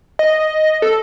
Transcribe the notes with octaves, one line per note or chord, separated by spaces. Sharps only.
D#5
A4